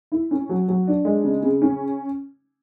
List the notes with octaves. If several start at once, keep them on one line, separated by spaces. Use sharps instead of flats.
E4
C#4
F#3
F#3
D4
G#3
C#3
C#3
C#4